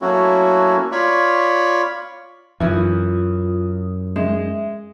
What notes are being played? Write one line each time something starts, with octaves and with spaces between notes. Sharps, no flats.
F#3 A3 A#3 C#4 E4 F#4
F4 C#5 D5 B5 C#6
F#2 E3 F4 D#6
G#3 E5